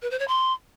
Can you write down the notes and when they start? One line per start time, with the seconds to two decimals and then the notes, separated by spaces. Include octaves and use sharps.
0.02 B4
0.11 C5
0.19 C#5
0.28 C6